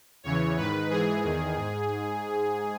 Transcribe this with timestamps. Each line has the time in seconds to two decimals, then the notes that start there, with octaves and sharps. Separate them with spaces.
0.23 E2 C#3 E3 C#5
0.57 G#2 D#3 B4
0.90 G#2 E3 G#4
1.23 E2 D#3
1.56 G#2